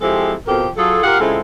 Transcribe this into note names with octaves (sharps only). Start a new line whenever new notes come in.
F3 G#3 C4 E4 G4 A4
F2 B2 F3 G4 A4 A#4
F#3 F4 G#4 A4
F4 G4 A#4 F5 F#5
C#3 G#3 C4 E4 F4 A4